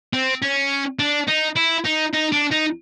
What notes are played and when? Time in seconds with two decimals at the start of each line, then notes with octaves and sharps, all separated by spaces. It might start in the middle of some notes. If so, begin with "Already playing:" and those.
0.13 C4
0.42 C#4
0.99 D4
1.28 D#4
1.56 E4
1.85 D#4
2.14 D#4
2.32 D4
2.51 D#4